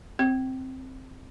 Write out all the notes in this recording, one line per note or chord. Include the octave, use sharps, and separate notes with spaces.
C4